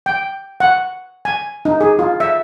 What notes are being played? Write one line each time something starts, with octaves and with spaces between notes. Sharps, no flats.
G5
F#5
G#5
D#4
G#4
F4
E5